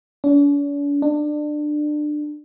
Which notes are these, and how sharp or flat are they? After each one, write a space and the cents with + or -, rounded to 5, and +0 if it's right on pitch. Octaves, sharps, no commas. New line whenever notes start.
D4 -45
D4 +25